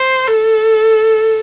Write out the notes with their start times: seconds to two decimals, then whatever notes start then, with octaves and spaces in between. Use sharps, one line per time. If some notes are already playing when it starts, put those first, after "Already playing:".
Already playing: C5
0.27 A4